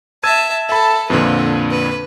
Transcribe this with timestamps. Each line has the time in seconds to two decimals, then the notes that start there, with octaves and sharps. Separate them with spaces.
0.23 E5 A5 E6 G#6 D#7
0.69 A4 E5 B5
1.10 F2 A#2 D3 B4
1.71 B4